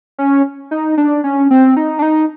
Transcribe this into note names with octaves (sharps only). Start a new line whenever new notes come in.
C#4
D#4
D4
C#4
C4
D#4
D4
D#4